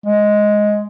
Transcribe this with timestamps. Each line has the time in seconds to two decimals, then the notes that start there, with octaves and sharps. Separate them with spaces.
0.06 G#3